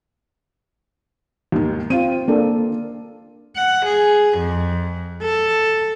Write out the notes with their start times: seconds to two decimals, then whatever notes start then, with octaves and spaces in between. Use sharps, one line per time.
1.52 D#2 D#3
1.90 C4 F4 D#7
2.28 A#3 D4 A4
3.56 F#5
3.86 G#4
4.38 F2
5.22 A4